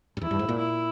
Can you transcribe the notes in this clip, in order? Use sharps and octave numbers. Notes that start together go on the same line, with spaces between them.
G2
E2 E4
G2
G#2
A#2
E4